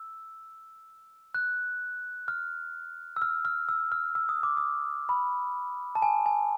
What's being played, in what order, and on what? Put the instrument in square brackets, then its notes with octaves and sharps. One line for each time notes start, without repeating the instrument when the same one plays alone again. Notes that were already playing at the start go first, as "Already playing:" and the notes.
Already playing: [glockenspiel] E6
F#6
F6
E6
F6
F6
E6
F6
E6
D#6
D6
D#6
B5
A5
G#5
G#5